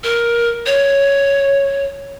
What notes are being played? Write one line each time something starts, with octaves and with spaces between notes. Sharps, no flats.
A#4
C#5